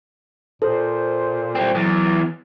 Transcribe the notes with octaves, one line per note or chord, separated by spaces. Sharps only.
A#2 A4 C5
G3 C4
E2 F#3